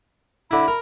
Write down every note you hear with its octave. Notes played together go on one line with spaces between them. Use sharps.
D3 E4 B5
A#4